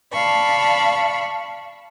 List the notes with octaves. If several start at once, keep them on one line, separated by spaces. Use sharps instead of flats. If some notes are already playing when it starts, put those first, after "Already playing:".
D5 F5 A5 B5 C#6